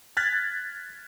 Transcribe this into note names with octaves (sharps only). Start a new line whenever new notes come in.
F6 F#6 G#6 A6 B6